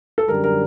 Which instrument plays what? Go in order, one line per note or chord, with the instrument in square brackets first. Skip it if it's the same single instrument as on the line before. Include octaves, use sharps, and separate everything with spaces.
[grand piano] A4
[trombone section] F#2 D3 G3 [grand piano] A#4
[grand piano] A#4